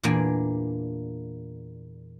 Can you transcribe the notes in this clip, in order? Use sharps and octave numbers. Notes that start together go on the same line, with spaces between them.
E2 A#2 A#3 D4 G#5